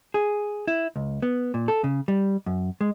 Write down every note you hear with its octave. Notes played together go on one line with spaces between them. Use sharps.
G#4
E4
C#2
B3
A#2
A4
C#3
G3
F#2
G#3